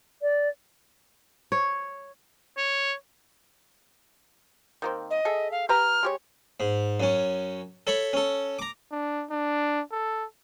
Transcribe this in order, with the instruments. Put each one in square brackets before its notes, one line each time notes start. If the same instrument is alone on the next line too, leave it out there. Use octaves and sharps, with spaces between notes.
[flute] D5
[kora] C#5
[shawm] C#5
[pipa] D#3 A#3 C4
[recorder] D#5
[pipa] G#4 A4 E5
[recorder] F5
[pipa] G4 B4 A#5 [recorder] F6
[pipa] G#3 G4 C#5
[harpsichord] G#2
F#2 C#4
A4 C#5 B5
C#4 A4
A#5 D6
[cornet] D4
D4
A4